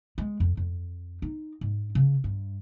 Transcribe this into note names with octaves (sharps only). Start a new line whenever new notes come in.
G#3
F2
F2
D#4
G#2
C#3
G2